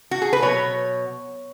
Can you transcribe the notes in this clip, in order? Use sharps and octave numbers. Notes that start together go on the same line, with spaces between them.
F#4
G#4
B4
B2 F#3 C#5